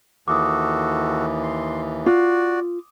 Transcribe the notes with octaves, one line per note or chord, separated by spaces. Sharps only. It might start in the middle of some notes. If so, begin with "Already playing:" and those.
D#2 E3 F#4 A4 D6 D#6
C6
F4 F#4 D5